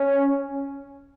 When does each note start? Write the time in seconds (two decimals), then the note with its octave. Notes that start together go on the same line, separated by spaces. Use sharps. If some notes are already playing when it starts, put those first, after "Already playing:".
Already playing: C#4